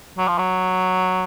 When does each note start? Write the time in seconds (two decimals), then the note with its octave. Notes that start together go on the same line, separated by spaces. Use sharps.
0.18 F#3
0.28 F3
0.38 F#3